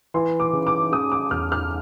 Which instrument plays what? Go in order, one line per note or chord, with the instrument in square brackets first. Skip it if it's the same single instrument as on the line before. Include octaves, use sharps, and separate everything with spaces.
[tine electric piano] E3 [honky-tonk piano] C6
[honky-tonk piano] D6
[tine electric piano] C#3
[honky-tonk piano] D6
[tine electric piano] C#3 [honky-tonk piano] D#6
[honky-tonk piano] D6
[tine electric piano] E2 [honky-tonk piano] F6
[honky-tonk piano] F6